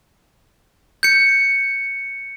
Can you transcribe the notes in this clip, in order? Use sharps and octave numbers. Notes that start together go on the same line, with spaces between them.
G6 C#7